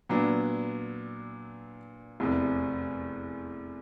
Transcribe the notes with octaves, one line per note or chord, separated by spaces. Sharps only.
A#2 F#3 B3 D4
F1 E2 C3